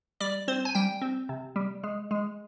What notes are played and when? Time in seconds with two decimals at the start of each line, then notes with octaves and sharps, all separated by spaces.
0.20 G3 D5
0.48 C4 C5
0.65 G#5
0.75 G3 G5
1.02 C4
1.29 C3
1.56 G3
1.84 G#3
2.11 G#3